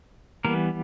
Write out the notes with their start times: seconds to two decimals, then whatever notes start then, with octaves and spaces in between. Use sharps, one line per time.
0.45 E3 G3 A#3 B3 A#4